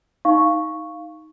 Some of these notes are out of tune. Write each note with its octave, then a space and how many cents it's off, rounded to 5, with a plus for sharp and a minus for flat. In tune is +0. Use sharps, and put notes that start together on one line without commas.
D#4 +15 F5 +0 C#6 +0